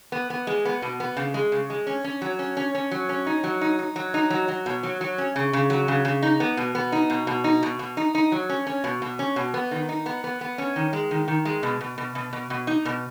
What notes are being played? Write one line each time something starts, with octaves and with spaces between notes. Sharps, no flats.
B3
B3
G#3
B3
B2
B3
C#3
G#3
C#3
G#3
C#4
C#4
F#3
C#4
C#4
C#4
F#3
C#4
D#4
F#3
D#4
D#4
F#3
D#4
F#3
F#3
B2
F#3
F#3
C#4
C#3
C#3
F#3
C#3
C#3
D#4
B3
B2
B3
D#4
B2
B2
D#4
B2
B2
D#4
D#4
F#3
C#4
C#4
B2
B2
C#4
B2
B3
D#3
D#4
B3
B3
B3
C#4
D#3
G#3
D#3
D#3
G#3
B2
B2
B2
B2
B2
B2
D#4
B2